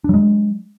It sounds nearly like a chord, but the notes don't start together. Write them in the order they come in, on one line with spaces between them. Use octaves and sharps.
D4 F#3 G#3